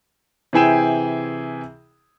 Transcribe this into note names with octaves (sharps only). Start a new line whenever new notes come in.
C3 E3 E4 G#4 G5 E7